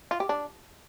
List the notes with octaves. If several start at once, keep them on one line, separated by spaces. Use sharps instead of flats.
F4
G4
D4